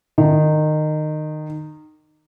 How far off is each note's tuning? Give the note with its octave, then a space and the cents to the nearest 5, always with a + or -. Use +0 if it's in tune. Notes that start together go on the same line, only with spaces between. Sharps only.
D#3 -20